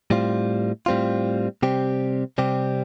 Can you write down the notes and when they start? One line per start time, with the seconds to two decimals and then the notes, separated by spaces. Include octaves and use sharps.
0.10 A2 G3 C4 F4
0.86 A2 G3 C4 F4
1.62 C3 G3 C4 G4
2.38 C3 G3 C4 G4